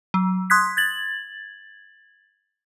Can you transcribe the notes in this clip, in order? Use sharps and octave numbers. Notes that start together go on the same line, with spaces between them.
F#3
C6 D#6 F#6 G#6 B6
G#6 A6 F#7